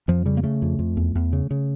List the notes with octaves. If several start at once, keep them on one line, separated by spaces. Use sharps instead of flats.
F2 F3
C#3 G3
A#3
C#3 A3
F2
F2
E2
E2
C#3
C#3